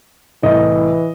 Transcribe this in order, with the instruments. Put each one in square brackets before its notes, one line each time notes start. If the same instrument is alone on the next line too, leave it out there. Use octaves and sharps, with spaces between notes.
[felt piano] C2 A2 [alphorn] E3 [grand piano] D#5